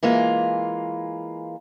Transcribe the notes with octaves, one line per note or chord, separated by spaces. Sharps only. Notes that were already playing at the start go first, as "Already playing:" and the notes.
E3 G#3 A#3 F4